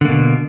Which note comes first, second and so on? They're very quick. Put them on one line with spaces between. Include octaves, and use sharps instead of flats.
D3 A#3 B2